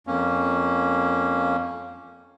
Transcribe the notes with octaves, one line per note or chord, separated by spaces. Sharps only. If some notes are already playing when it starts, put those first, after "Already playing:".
F2 A#3 C#4